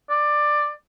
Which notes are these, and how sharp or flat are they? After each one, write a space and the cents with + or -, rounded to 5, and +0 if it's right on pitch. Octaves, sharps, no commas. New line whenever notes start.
D5 +15